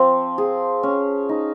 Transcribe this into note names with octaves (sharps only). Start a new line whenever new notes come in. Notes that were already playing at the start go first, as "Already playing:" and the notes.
Already playing: F3 C4
G#4
C#4
D#4